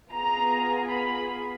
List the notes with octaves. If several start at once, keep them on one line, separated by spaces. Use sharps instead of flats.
B3 F4 G#4 A#5
B5